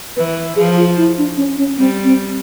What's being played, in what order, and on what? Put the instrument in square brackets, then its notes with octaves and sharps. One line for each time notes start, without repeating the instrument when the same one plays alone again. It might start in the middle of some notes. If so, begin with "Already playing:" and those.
[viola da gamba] E3 [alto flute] B4
[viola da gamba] F3 [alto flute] G#4
[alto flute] F4
E4
D4
C#4
C#4
[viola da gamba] G3 [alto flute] C4
[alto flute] C4